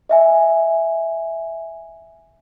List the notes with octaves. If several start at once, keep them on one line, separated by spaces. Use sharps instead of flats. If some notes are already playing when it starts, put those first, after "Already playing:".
D#5 E5 G#5